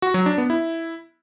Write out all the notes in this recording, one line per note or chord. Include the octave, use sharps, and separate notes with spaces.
F#4
F#3
D4
B3
E4